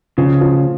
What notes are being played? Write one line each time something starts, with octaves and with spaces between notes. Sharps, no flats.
C#3 F3 F4
F3 F4